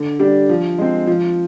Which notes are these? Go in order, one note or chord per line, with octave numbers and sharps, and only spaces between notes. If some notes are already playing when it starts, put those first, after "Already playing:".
Already playing: D3
G3 D4 G4
F3
G#3 C4
F3